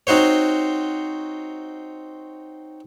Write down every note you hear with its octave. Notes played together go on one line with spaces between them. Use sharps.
C4 D#4 F#4 C5 C#5